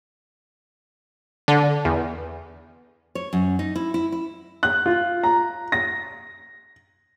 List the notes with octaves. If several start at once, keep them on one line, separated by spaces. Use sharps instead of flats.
D3
E2
C#5
F#2
D#4
E4
E4
E4
F#6
F4
A#5
A#6